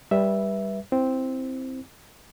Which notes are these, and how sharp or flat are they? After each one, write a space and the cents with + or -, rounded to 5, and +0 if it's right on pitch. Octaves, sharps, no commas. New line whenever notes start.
G3 +10 B4 -20 E5 +0
C4 +0 E4 +0